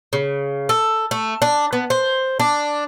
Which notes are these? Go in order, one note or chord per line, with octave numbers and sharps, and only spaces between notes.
C#3
A4
A3
D4
B3
C5
D4